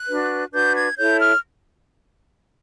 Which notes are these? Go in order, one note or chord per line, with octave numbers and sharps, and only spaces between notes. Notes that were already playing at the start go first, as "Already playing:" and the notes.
Already playing: F#6
D4 F#4 B4
D4 F#4 B4 G6
G#6
E4 A4 C#5 G6
F6